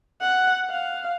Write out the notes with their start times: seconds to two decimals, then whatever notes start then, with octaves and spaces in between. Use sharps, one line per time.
0.21 F#5
0.70 F5